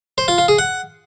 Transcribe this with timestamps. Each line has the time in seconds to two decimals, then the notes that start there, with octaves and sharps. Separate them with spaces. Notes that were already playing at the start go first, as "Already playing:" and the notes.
0.18 C5
0.28 F4
0.38 F4
0.48 G#4
0.58 F#5